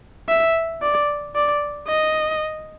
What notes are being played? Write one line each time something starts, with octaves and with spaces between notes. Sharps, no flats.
E5
D5
D5
D#5